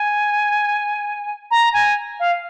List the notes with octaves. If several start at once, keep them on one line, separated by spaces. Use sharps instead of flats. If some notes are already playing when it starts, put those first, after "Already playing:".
Already playing: G#5
A#5
G#5
F5